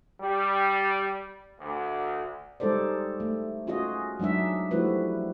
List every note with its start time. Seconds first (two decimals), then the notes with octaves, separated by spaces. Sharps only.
0.21 G3
1.59 D2
2.60 G3 G#3 D#4 A4 C5 D5
3.20 A3
3.67 C#4 F4 F#4 G#4 D#5
4.20 F#3 G#3 D4 D#4 E5
4.71 F3 G3 A3 E4 F#4 B4